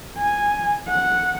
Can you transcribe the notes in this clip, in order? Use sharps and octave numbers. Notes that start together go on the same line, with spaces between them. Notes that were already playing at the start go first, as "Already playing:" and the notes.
G#5
F#5